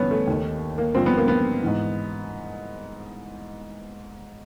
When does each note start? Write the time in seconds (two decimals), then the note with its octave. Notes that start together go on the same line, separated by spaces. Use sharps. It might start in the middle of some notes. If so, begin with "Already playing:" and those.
Already playing: G2 E3 B3 C#4
0.11 A3
0.27 D#2 D#3
0.78 A#3
0.95 G2 D3 F3 C4
1.06 B3
1.17 A#3
1.28 B3
1.62 G#2 E3